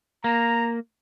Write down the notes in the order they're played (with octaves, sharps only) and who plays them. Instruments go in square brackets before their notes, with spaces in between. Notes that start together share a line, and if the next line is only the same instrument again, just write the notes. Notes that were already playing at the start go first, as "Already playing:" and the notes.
[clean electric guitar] A#3 [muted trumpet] A#5